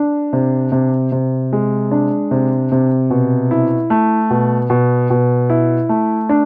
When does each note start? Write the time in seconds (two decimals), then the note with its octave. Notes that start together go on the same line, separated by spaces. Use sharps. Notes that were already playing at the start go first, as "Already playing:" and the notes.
Already playing: D4
0.33 C3
0.72 C3
1.12 C3
1.53 G#3
1.91 D4
2.31 C3
2.72 C3
3.10 B2
3.51 E4
3.90 A3
4.30 B2
4.70 B2
5.10 B2
5.50 E4
5.89 A3
6.29 D4